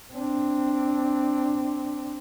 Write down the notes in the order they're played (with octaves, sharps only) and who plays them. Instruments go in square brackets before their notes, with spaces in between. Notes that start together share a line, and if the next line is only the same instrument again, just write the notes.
[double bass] C4 D4